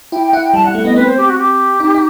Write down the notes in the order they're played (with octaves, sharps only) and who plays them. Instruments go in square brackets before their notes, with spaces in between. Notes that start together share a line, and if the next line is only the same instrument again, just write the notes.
[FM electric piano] E4 [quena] G5
[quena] G5
[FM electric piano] E4 [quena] F#5
[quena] G5
[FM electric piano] G3 [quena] A5
[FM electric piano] G3 [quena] F#5
[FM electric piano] A3 [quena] F#5
[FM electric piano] B3 [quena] D#5
[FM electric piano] C4 [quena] B4
[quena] C5
G4
F#4
G4
[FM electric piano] D#4
D#4